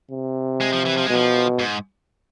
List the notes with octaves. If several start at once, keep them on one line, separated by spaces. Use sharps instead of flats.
C3
G#3
F3
E3
F3
G#3
B2 F3
G#2